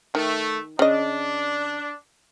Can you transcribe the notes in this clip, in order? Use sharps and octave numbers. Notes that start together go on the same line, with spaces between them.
D#3 A3
C#3 D4 D#5